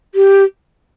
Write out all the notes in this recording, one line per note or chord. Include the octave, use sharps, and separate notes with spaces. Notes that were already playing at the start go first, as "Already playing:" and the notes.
G4